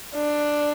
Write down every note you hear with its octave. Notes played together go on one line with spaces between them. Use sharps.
D4